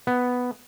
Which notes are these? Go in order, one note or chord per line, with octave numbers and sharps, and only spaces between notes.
B3